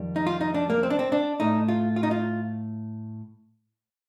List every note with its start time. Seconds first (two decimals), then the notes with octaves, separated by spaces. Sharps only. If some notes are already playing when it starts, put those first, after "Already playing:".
Already playing: F2 D#3 G3
0.16 D#4
0.27 F4
0.41 D#4
0.54 D4
0.70 A#3
0.83 C4
0.90 D4
0.99 C4
1.12 D4
1.40 A2 A3 D#4
1.68 F4
1.96 F4
2.03 D#4
2.11 F4